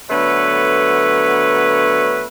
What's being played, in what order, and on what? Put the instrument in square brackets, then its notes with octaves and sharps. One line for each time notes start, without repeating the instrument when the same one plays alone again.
[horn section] D3 F#3 A3 B3 B4 C#5